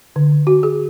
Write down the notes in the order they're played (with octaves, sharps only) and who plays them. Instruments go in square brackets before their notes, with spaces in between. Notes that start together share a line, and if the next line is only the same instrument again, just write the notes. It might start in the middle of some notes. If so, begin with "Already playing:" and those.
[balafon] D3
F#4
G#4